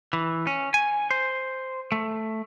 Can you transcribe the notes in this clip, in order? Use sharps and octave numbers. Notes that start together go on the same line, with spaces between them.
E3
C#4
G#5
C5
A3